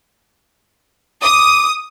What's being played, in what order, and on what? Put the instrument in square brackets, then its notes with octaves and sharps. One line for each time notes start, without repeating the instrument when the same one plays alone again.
[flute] D6 [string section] D#6